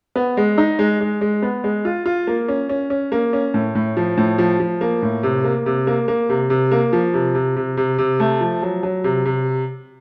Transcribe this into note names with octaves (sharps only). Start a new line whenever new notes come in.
B3
G#3
D#4
G#3
G#3
G#3
B3
G#3
F4
F4
A#3
C#4
C#4
C#4
A#3
C#4
A2
A2
F3
A2
F3
F3
A#3
A2
C3
A#3
C3
A#3
A#3
C3
C3
A#3
F3
C3
C3
C3
C3
C3
A3
F3
F#3
F#3
C3
C3